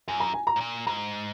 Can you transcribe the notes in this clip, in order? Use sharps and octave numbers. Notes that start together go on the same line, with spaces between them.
F#2 G#5
A#5
G#5
A#5
G#2
A#2
G#2 A#5